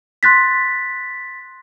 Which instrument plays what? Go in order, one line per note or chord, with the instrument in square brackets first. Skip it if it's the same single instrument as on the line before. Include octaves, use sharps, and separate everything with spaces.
[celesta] C6 F#6 A6 B6